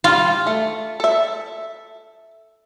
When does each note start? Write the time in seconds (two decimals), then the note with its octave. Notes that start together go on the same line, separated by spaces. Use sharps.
0.04 G3 F4
0.47 A3
1.00 A4 E5